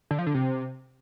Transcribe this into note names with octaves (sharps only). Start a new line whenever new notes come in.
D3
F3
D3
C3